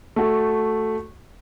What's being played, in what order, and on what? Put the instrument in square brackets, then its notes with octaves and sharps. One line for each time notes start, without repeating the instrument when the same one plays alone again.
[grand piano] A3 F#4 A4